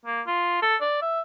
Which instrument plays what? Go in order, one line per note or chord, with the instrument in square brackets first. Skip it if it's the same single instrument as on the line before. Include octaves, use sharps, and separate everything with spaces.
[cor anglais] A#3
F4
A4
D5
E5